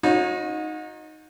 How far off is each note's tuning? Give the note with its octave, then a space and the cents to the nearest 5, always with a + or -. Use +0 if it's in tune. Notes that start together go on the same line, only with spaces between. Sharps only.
D#4 +0 F#4 -40 C#5 -25